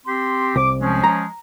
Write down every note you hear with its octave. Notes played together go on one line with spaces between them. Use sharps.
C4 G4 C6
C2 D6
F3 G#3 C#4
A#5